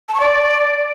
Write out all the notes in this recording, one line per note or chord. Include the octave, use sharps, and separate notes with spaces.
A5
C#6
D5